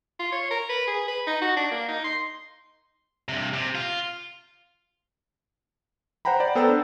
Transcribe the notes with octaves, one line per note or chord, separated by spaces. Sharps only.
F4
C#5
A#4
B4
G#4
B4
D#4
F#4
D4
A#3
D#4
C6
G2 C3
C3
F4
C5 F#5 G5 A#5 B5
D5
B3 A4 C5 G5 A#5 E6
D4